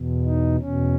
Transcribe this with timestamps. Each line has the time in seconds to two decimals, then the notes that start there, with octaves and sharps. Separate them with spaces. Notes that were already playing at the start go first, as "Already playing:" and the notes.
Already playing: E2 B2
0.25 D#4
0.60 E2 B2 C#4